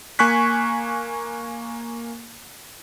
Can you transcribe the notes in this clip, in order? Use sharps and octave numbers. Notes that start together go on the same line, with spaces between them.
A#3 G#5 C#6 F#6 B6